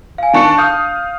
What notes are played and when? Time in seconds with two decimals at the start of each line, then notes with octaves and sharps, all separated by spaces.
0.18 F5 G#5
0.34 D#3 D4 A5 C#6 C#7
0.58 F5 D#6 F6 G6